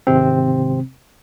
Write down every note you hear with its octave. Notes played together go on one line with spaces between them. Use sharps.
G#1 C3 C4